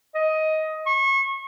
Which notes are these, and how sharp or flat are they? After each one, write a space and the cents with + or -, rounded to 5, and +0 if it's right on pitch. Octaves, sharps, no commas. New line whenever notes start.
D#5 +10
C#6 -30